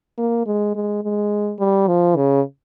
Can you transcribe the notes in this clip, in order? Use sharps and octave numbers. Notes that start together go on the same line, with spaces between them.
A#3
G#3
G#3
G#3
G3
F3
C#3